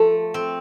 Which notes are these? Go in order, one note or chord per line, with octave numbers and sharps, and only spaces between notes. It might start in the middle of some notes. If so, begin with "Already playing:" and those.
Already playing: F3 A3
C4